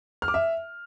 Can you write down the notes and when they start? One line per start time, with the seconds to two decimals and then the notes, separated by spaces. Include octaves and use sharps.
0.22 F6
0.28 D6
0.34 E5